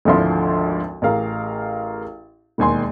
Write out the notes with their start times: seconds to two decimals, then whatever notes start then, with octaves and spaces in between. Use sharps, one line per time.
0.05 G#1 D2 D3 F3 E4 C6
1.02 A1 G#4 A#4 F5
2.58 E1 D#2 G#5 C6